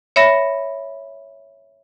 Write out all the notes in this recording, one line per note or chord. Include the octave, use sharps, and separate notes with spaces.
C#5 E5 B5 A#6